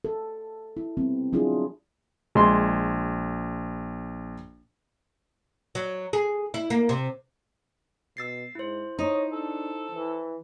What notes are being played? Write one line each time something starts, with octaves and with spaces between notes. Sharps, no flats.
A4
E4
G3 B3 C4
F#3 D4 E4 F4 G#4
A#1 G#3 C6
F#3
G#4
E4
A#3
C3
B2 E6 A6 C7
G#2 E4 C5
D#4 C#5 D#5
D4 A4
E3